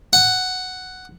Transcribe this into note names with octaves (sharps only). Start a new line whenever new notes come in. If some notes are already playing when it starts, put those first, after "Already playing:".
F#5